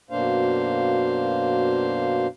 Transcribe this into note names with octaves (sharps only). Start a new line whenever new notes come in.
F#2 B2 A#3 D4 C5 F5